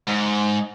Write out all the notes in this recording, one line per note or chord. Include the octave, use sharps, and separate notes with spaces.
G#2